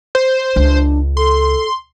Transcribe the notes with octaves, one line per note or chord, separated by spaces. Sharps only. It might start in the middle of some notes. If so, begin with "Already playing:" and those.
C5
C#2 D4
A4 C6